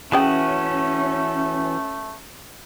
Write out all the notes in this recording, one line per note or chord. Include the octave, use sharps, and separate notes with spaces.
E3 F3 A3 C#4 F#4 G#4 G5